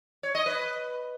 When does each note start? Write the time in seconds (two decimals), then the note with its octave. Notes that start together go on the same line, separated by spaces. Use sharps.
0.23 C#5
0.35 D#5
0.46 B4